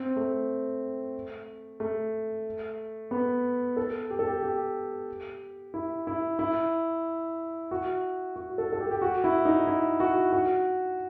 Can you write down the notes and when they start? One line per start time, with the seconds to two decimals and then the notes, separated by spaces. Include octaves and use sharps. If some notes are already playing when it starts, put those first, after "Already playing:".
Already playing: C4
0.16 A3
1.80 A3
3.11 B3
3.77 A4
4.10 G4
4.19 A4
4.28 G4
4.43 G4
5.74 E4
6.07 E4
6.39 E4
7.71 F#4
8.36 F#4
8.58 A4
8.72 A4
8.80 G4
8.91 G4
9.02 F#4
9.24 E4
9.45 D#4
9.67 E4
10.00 F#4
10.32 F#4